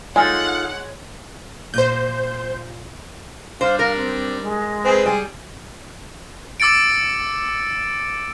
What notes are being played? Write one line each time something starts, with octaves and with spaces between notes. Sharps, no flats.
G#3 D#4 F4 A4 C#5 F#5
A#2 C5 G6
G3 D4 C5 F5
A#4 F5
C4
G#3
C4 G#4 B4
G3 G#4
D6 E6 A6 C#7 D7